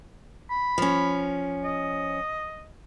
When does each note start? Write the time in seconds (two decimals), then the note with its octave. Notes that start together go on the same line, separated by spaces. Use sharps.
0.50 B5
0.78 F3 C#4
1.64 D#5